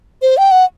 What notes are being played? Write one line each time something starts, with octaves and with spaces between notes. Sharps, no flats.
C5
G5
F#5